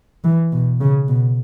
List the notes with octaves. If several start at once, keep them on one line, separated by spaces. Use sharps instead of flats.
E3
B2
C#3
B2